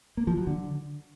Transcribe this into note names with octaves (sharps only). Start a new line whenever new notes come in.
A#3
F3
F#3
D3